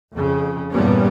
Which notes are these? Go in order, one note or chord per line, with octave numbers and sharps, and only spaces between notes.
F2 C#3
E2 G2 A#2 G3 B3 C#4